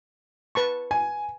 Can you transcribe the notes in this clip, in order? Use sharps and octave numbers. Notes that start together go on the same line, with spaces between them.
B4 A5 C#6
G#5